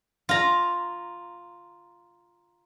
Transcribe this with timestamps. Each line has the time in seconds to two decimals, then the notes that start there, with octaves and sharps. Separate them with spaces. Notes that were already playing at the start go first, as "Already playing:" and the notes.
0.29 F4 A#5